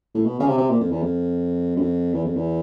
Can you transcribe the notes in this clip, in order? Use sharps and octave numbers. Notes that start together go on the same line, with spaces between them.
A2
B2
C#3
C3
C3
A#2
F2
E2
F2
F#2
F2
E2
F2
E2